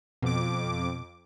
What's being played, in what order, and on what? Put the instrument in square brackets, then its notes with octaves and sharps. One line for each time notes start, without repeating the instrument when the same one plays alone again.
[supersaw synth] F2 D6 [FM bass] B2